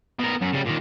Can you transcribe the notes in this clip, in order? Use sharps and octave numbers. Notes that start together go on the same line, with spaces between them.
B2 A#4
F#2
C#3 G3
A#2 D#3